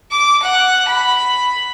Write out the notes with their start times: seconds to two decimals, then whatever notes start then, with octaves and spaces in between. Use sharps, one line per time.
0.12 D6
0.43 F#5
0.88 B5